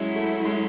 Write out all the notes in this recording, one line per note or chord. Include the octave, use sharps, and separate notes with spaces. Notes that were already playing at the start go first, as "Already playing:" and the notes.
Already playing: F#3 G#3 C#4 E4
A3
G#3